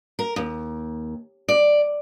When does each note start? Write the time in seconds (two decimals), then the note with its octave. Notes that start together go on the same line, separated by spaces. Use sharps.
0.19 A#4
0.36 D#2
1.48 D5